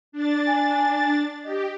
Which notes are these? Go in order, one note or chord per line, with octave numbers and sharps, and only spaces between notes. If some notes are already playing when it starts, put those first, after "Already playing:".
D4 A6
G#5
G4 D#5